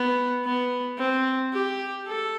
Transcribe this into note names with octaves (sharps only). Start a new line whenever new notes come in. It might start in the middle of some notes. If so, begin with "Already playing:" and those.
Already playing: B3
B3
C4
G4
A4